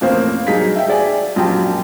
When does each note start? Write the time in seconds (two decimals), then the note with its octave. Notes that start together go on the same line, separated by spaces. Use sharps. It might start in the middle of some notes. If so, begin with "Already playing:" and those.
0.01 A1 F2 A#3 C5
0.47 G2 F#3 D#4 G#4 F5 B6
0.76 E5 F5 G5
0.88 G#4 D5 G#5
1.36 A#1 F#2 G4 G5 A5